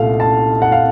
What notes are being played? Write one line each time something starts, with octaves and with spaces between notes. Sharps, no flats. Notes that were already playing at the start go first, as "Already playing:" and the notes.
Already playing: C2 A#2 A3 F5
A5
F#5
F5